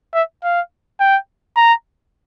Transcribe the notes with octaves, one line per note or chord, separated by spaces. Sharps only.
E5
F5
G5
A#5